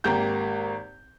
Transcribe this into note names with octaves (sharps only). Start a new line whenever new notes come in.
G#1 A#3 G4 A#5 G6